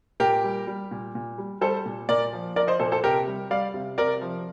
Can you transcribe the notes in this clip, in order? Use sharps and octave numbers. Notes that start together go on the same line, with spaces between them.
A#2 G4 A#4
G3
G3
A#2
A#2
G3
G3 A4 C5
A#2
A#2 A#4 D5
F3
F3 A#4 D5
C5 D#5
A#2 A4 C5
A4 C5
C3 G4 A#4
G3
G3 D5 F5
C3
C3 A#4 D5
F3